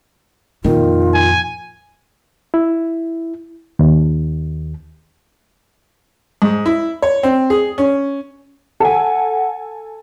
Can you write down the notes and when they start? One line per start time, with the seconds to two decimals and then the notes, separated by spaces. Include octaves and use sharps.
0.64 F2 A#2 D#3 F4
1.14 G#5
2.54 E4
3.79 D#2
6.42 G#2
6.66 E4
7.02 C#5
7.23 C4
7.50 G#4
7.78 C#4
8.80 A4 F#5 G#5